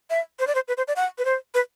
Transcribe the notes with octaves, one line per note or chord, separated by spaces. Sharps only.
E5
C5
D5
C5
B4
C5
D5
F#5
B4
C5
B4